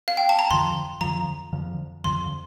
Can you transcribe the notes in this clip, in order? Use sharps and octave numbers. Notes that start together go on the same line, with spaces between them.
F5
G5
A5
A#5
F2 D3 F3 C6
F2 D3 F3 A#5
F2 D3 F3
F2 D3 F3 C6